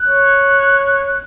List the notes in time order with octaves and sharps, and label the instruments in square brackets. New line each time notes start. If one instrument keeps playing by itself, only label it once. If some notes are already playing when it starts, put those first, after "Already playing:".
Already playing: [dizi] F#6
[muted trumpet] C#5